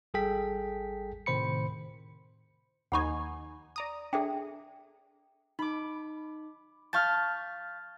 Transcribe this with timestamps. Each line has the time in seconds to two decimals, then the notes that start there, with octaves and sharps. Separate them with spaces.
0.14 G#1 G3 G#4 A4 G5 B6
1.26 A2 C3 D#3 C5 B5 C#7
2.92 D#2 D#4 F#5 G#5 B5 C#6
3.76 D5 A#5 D#6
4.13 D4 G#4 A4 E5 G5
5.59 D#4 B5 D6
6.93 F5 A5 C#6 F6 G6 A6